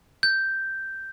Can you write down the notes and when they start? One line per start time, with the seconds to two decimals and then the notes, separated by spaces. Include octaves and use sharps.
0.23 G6